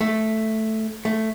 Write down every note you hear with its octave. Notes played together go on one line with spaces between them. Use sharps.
A3
A3